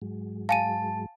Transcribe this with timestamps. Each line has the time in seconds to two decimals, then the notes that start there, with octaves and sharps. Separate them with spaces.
0.02 G#2 F#3 G#3
0.49 F5 G#5 A5 D#7